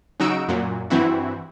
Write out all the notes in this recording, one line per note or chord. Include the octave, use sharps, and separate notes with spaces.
C#3 F#3 D#4 F#4 E6 D7
F#2 A#2 F#3
G2 E3 C4 E4 F#4